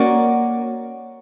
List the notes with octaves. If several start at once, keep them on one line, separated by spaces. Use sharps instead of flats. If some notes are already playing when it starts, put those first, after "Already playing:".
Already playing: A#3 C#4 F#4 A#4 D5